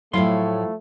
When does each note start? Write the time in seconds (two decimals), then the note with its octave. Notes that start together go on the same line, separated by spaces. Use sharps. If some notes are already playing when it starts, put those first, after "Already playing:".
0.13 A2 F3 F#3 A3 E4 F5 C6